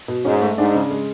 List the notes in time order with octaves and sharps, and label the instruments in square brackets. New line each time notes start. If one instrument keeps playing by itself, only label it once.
[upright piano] B2
[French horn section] G#2 [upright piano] C#4
[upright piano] A3
[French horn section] G#2 [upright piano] D4
[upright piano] C#3
G#3